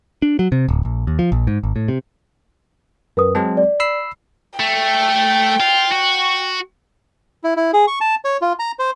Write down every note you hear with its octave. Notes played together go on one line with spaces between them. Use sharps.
D4
F#3
C3
D1
A#1
D#2
F3
A#1
G#2
G#1
A2
C3
F#2 A#4 B4 D#6
F#3 G#3 C4 A5
D5
B5 E6 C7
A3 G5
F4
F#4
E4
E4
G#4
C#6
A5
C#5
F4
A#5
C5